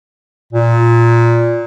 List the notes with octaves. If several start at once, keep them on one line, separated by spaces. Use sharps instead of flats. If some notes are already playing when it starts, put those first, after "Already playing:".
A#2